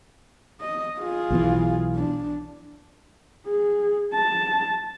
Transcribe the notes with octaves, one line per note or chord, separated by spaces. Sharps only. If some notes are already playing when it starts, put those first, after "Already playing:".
D#5
F4 G#4
B1 B2 E3
D4
G#4
A5